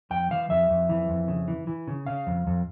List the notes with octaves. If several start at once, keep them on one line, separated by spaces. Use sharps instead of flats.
F2 G5
E3 F5
F2 E5
F2
E3
F2
C#3
E3
E3
C#3
C#3 F5
F2
F2